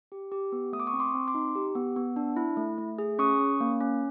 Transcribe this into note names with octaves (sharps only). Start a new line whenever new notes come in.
G4
G4
B3
A3 D#6
D6
C#6 D#6
C4
C6 D6
C4
C6 D6
D#4
G4
B3
B3
D4
E4
A3
A3
G#4
C#4 C#6 D#6
C#4
A#3
C#4